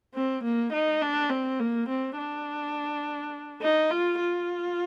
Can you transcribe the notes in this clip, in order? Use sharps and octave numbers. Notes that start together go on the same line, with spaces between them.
C4
A#3
D#4
D4
C4
A#3
C4
D4
D#4
F4
F4